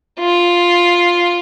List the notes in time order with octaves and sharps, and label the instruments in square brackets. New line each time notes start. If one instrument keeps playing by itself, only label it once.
[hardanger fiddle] F4